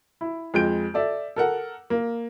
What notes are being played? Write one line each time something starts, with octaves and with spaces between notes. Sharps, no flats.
E4
F2 G#3 G6 D7
A4 D5 E5
A4 A#4 F#5
A#3